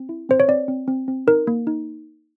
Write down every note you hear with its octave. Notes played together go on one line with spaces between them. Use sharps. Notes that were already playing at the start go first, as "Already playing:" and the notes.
Already playing: C4
E4
C4 C5
C#5
C4 D5
C4
C4
C4
D#4 A#4
A#3
D#4